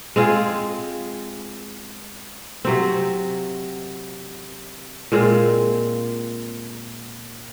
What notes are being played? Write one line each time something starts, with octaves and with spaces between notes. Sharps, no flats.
G#3 C4 F4 G#4
C3 F#3 C4
A#2 G#3 C4 F4